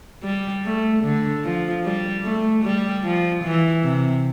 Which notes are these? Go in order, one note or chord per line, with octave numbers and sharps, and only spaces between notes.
G3
A3
D3
F3
G3
A3
G3
F3
E3
C3